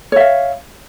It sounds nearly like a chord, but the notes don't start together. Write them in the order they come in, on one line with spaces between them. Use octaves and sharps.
C#5 E5 F5